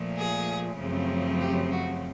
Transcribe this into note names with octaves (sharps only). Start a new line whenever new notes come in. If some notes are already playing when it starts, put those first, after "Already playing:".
Already playing: A#2 F3 A3
G#4
F#2 C#3 F3 A3 C4
G4
F#4